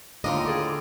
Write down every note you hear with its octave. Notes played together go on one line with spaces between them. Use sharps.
D#2 A2 D3 F4 D#5 D6
G#4 A4 D6